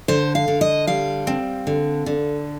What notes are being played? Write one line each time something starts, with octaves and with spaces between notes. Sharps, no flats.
D3 C5
F5
D3
D#5
G3 F5
C4
D3
D3